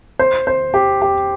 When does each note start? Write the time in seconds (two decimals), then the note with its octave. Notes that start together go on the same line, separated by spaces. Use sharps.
0.19 C5
0.47 C5
0.74 G4
1.02 G4